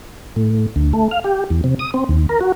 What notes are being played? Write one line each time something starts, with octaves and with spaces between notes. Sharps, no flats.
A2
D2
A3
F5
G4
E2
C3
D#6
C4
D#2
A#4
F#4